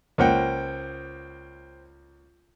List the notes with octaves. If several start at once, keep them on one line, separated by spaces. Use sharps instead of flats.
C#2 A#3 C5 F#5 G5